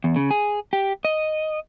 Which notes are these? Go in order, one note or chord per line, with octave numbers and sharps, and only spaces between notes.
E2
C#3
G#4
G4
D#5